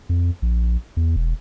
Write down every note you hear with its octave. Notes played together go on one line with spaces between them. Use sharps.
F2
A#1
E2
E1